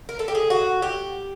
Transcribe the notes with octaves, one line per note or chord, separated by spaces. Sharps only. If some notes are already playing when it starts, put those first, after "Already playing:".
A#4
A4
G4
G#4
F#4
G4